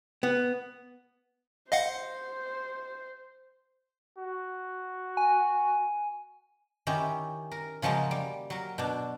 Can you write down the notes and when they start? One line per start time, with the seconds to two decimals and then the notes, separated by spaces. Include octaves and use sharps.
0.23 B3
1.72 C5 D#5 F5 F#5
4.18 F#4
5.17 G#5
6.87 D#3 C#4 E4 G4
7.51 A#4
7.82 C#3 F3 F#3 G#3 A#3
8.11 G3
8.50 F#3 A#4
8.78 B2 D4